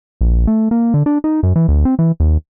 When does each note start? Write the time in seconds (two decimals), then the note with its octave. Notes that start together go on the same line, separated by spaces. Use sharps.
0.21 A#1
0.47 A3
0.71 A#3
0.94 D3
1.06 D4
1.24 D#4
1.43 F#2
1.56 E3
1.68 D2
1.85 C4
1.99 E3
2.20 D#2